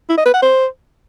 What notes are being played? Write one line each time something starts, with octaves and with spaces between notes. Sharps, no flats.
E4
D#5
B4
F#5
C5